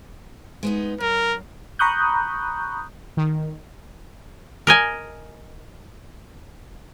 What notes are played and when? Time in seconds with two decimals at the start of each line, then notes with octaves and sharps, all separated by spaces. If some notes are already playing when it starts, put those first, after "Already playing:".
0.63 G#3 B3 D#4
1.00 F#2 A#4
1.79 A#5 B5 C#6 D#6 F#6 G6
3.17 D#3
4.67 A#4 D#5 G#5